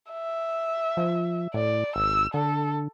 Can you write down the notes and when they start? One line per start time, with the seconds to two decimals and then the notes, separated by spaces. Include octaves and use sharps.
0.11 E5
0.97 F3
1.54 A2 D5
1.96 G#1 E6
2.34 D3 A4